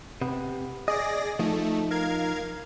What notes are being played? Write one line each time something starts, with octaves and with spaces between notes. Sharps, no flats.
C3 B3
G#4 D5 D#5 A#6
F3 A3 D#4
A#4 F5 G#6